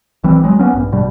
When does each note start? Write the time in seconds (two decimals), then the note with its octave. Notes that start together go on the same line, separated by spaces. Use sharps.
0.24 A#1 E3 G3 C4
0.44 F#3 G#3
0.59 A#3 B3 C#4
0.73 A#1 G2
0.92 A#1 G2 B2 G3